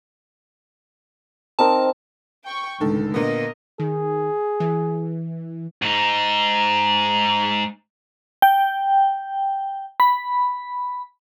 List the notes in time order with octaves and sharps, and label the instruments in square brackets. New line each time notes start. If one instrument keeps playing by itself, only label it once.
[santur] C4 D#4 A#4 [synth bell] A5
[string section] G5 C#6
[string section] C#2 A2 [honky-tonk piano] D3 D#3 A4
[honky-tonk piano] A#2 D3 B3 [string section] A#4 D#5
[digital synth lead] D#3 [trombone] G#4
[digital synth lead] E3
[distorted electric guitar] G#2 D#4
[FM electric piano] G5
B5